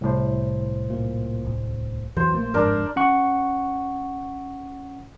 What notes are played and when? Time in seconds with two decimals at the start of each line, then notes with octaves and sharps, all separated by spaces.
0.01 C2 A2 C5
0.90 A#2
1.45 D1
2.17 F2 E3 F#3 C5
2.33 A#1 A3 A#3
2.54 G1 F2 G#2 D4 A#4
2.96 C#4 F#5 C#6